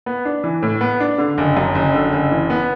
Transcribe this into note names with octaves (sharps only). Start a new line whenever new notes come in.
B3
D4
E3
A2
B3
D4
D3
F#1
F#2
F#1
D3
F#1
E3
B3